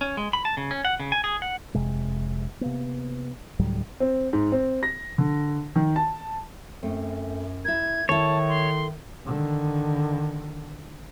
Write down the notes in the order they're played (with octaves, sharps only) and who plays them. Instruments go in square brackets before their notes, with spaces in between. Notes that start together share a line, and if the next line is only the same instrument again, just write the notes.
[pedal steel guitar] C#4
G#3
B5
A5
C#3
C#4
F#5
C#3
G#5
G#4
F#5
[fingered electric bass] F1 C3 G#3
C3 A#3 B3
D2 A2 F#3 G3
[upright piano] C4
G#2
C4
A#6
D3
D#3
A5
[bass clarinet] F#2 [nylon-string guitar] A3 C4
[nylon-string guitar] E4 A#4 [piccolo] G#6
[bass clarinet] D#3 [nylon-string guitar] E4 A4 [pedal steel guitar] C#5 [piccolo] A5
[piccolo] C6
[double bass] D3 D#3